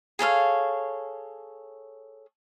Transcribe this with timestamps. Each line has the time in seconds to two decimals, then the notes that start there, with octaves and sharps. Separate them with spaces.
0.19 G#4 A4 C#5 F5